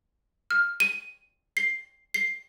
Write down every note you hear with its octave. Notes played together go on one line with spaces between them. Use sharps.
F6
D#7
C7
C7